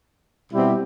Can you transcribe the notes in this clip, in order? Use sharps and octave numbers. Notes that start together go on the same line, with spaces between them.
B2 G3 C4 E4 G4